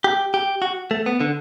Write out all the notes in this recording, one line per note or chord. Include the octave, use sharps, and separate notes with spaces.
G4
G4
F#4
A3
B3
D3